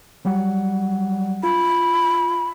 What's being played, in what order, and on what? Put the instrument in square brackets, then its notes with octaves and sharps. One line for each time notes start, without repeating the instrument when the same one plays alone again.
[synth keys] F#3 G3 F#5
[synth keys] F4 [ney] B5